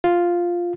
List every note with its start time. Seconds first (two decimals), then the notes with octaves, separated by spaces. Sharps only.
0.04 F4